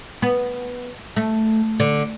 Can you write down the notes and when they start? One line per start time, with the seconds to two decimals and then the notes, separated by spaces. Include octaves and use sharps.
0.22 B3
1.16 A3
1.80 D3